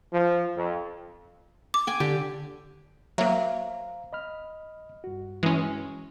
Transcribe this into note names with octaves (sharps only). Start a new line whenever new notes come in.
F3
F2
D6
G5 G#5
D3 G4
F#3 A#3 C5 E5 F5 A#5
D#5 B5 F6
G2 F#4
E3 G#3 C#4